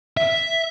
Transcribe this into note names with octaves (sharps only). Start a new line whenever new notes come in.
E5